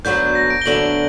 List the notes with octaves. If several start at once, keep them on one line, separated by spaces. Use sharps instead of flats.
D2 D3 F#3 B3 D4 G6
A#6
D7
G7
D2 D3 F#3 B3 D4 F#7